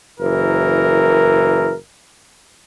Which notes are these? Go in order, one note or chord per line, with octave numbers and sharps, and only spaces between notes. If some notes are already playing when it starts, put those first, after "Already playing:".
F#1 E3 A#4